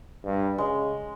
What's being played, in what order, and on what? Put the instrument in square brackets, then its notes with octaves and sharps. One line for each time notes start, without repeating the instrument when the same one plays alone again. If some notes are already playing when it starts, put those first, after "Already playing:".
[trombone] G2
[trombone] C#3 [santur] G#3